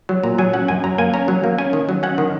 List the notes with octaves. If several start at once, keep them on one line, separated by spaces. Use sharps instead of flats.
F#3
A#2 A#5
F#3 G#5
C#4 F#5
F#2 G#5
F#3 A#5
A#3 G#5
C#4 A#5
F#3
A#3
C#4 G#5
D#3
F#3
C#4 F#5
D#3